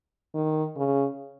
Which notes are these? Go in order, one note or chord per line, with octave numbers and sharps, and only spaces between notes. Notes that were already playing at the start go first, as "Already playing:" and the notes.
D#3
C#3